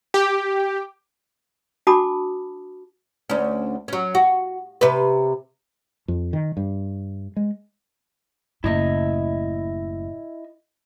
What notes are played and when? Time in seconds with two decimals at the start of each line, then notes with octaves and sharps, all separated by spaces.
0.14 G4
1.87 D4 F#4 A5 B5 D6 D#6
3.30 D2 C#4
3.88 F#3 C#4
4.15 F#4
4.81 C3 B4
6.08 F2
6.33 D#3
6.57 G2
7.36 G#3
8.64 F#1 A2 E4 D#5 E5